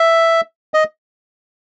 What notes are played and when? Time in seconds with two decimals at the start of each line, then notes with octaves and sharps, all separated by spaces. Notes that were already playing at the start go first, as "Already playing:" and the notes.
Already playing: E5
0.74 D#5